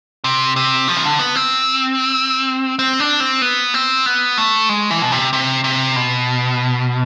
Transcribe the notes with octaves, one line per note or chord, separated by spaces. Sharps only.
C3
C3
F3
E3
D3
B3
C4
C4
D4
C4
B3
C4
B3
A3
G#3
E3
B2
C3
C3
C3
B2